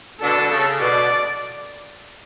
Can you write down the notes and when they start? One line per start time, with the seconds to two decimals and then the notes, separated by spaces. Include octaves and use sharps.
0.21 B2 D3 A4
0.51 C#3
0.80 B2 D5